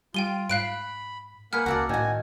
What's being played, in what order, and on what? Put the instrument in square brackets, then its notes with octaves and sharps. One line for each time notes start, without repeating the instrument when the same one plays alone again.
[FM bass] G3 [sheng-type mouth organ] F4 [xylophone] G5 D#7 G7
[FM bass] G#2 [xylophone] F5 F#6 D7 [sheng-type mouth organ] B5
[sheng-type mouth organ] A#3 F#5 [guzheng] G#4 B4 [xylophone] F6
[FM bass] C#2 [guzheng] F#4 A4 D5
[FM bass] A2 [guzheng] D#3 F#4 [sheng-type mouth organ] G#5